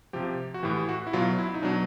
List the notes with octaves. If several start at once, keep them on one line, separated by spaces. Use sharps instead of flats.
C3 F3 G4
F#4
A2 E3 G4
F#4
E4
B2 F#3 F4
E4
D#4
B2 F#3 D4